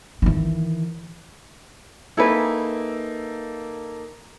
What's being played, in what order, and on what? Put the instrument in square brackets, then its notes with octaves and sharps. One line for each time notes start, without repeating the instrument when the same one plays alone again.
[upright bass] D#3 E3
[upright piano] A#3 D#4 A4 [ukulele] E4 G#4 B4